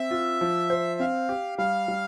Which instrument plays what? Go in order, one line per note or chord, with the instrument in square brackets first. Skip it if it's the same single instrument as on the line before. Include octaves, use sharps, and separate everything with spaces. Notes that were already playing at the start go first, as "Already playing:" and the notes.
Already playing: [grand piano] C4 [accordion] E5
[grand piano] F4
F3
C5
[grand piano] C4 [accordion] F5
[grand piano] G4
[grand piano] G3 [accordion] F5
[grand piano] G3